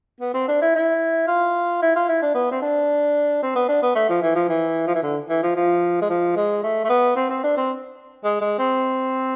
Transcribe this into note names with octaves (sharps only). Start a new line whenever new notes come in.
B3
C4
D4
E4
E4
F4
E4
F4
E4
D4
B3
C4
D4
C4
B3
D4
B3
A3
F3
E3
F3
E3
F3
E3
D3
E3
F3
F3
G#3
F3
G#3
A3
A3
B3
C4
C4
D4
C4
G#3
G#3
C4